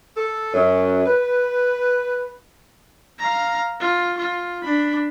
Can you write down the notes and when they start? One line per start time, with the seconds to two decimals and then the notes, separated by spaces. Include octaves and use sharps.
0.16 A4
0.52 F#2
1.05 B4
3.19 F5 A#5
3.80 F4
4.18 F4
4.63 D4 B5